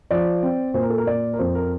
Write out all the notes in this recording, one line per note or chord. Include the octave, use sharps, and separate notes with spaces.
F3 D5
C4
A#2 C5
A#4
A4
A#4
A#2 D5
A#4
F2 C5
A#4